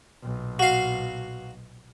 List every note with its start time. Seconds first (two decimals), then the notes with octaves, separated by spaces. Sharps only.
0.23 B1 A#2
0.59 F#4 F5